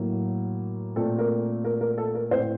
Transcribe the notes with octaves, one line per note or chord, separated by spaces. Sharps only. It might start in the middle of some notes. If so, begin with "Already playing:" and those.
Already playing: A2 F#3 A#3
A#2 A3 C4 A4
A#4
A#4
A#4
A4
A#4
A2 A3 C4 C5